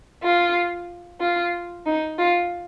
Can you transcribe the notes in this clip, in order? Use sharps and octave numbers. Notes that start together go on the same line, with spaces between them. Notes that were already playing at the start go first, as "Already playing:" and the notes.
F4
F4
D#4
F4